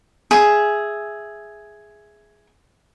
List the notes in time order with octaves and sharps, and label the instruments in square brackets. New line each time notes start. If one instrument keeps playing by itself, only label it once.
[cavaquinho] G#4 E5